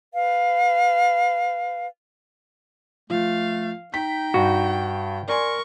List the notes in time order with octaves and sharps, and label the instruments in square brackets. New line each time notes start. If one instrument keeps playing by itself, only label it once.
[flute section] B4 F5
[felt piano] F3 [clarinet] A3 [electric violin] F5
[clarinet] D#4 [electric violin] G5 [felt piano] B6
[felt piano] G2 [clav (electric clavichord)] F#4
[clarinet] A#4 [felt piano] D5 G#5 C6 [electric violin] C#6